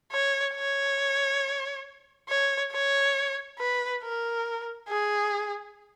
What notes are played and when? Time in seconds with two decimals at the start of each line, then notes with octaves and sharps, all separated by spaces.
0.12 C#5
0.55 C#5
2.29 C#5
2.72 C#5
3.59 B4
4.03 A#4
4.90 G#4